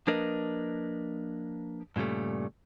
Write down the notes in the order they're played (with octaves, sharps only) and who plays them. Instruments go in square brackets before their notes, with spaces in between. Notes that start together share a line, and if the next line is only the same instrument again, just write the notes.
[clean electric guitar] F3 A#3 D4 A#4 B4 D#5
G2 A#2 C#3 G3 A3